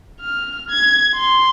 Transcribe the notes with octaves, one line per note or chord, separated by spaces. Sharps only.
F6
G#6
C6